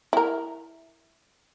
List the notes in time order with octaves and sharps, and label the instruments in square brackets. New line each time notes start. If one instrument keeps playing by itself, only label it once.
[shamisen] E4 A#4